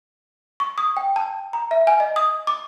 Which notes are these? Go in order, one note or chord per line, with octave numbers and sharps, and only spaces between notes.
C#6
D#6
G5
A5
A#5
E5
G#5
D#5
D#6
D6